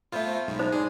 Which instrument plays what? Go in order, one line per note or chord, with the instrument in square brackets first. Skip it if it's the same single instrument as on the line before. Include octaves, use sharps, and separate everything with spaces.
[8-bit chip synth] A3 F4 [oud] B3 C4 E5
[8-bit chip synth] B1 G#2
[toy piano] D#4 C5
[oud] G#3 D5 [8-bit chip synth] G#4